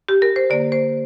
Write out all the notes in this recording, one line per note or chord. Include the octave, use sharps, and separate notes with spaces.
G4
A#4
C5
D3 A#3 D5
C5